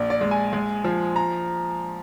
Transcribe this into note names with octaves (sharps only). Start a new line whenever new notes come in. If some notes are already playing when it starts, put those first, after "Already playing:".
Already playing: A#1 D5
D5
G#3
G#5
G#3
F3
A#5